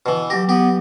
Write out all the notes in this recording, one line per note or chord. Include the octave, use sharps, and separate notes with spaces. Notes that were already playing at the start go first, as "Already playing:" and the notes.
B2 E3
F#3 G4 A#6
B3 G4